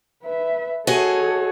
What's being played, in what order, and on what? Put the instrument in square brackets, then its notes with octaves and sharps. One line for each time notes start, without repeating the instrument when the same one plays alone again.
[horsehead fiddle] B4 E5
[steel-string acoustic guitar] F#4 G#4 D#5 [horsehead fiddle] A4 C#5